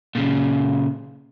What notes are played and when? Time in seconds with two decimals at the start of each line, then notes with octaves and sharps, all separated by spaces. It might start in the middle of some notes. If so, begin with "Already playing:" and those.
0.15 A#2 C#3